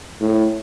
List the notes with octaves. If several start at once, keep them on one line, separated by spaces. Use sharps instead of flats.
A2